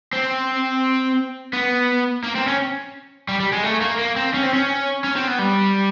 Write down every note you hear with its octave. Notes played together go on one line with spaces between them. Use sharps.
C4
B3
A#3
C4
C#4
G3
G3
G#3
A3
A#3
A#3
C4
C#4
C4
C#4
C#4
C4
B3
G3